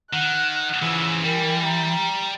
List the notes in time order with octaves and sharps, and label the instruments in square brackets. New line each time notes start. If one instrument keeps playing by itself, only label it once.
[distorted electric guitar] D#3 [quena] F#5 [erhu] F#6
[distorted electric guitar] C#3 F3 [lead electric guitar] E3 [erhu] E6
[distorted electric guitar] G3 [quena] A#4 [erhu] G5
[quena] A#5